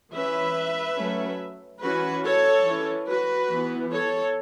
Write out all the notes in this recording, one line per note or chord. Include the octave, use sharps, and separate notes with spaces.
E3 C#4 B4 E5
F#3 A3 C#4
E3 C#4 F#4 B4
A4 C#5
E3 C#4
F#4 B4
E3 B3
A4 C#5